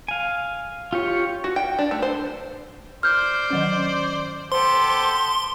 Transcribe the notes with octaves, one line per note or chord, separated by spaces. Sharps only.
F5 G#5
F4 G4 C#5
F#4
G5
D4
A3
C5
C5 D5 F6 G6
D#3 F#3 C#4
B3 G4 A4 C5 C6